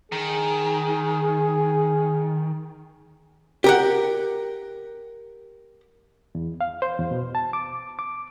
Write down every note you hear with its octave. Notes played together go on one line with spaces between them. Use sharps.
D#3 G#4
G4 A#4 F#5
E2
F5
C5
E2
B2
A5
D6
D6